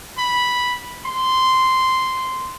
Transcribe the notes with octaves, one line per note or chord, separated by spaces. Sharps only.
B5
C6